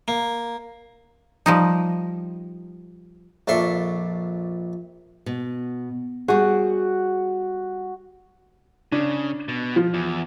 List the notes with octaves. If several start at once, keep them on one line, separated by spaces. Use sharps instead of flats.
A#3
F3 G3 D#4
A#1 F2 D4 E5 C6 C#6
B2
G3 F#4 G#4
C#3 D4
B2
F3
E2